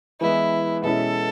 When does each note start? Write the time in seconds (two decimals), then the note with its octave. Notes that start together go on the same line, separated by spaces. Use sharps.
0.20 E3 G#3 B3 E4
0.83 B2 G#3 C#4 E4 A4